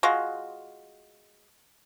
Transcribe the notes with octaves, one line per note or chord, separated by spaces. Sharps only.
G#3 F4 F#4